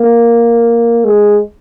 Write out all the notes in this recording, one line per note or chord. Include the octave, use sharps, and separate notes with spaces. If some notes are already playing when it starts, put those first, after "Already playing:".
Already playing: A#3
G#3